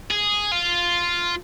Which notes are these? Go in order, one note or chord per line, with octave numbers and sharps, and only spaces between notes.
G#4
F4